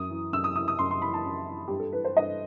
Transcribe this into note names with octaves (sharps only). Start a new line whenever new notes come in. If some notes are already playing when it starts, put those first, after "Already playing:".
Already playing: F#2 D#6
E3
F#2 E6
D#6
E3 D#6
D#6
F#2 C6
C6
E3 B5
A5
F#2
E3
G2 G4
A4
E3 B4
C5
G2 D#5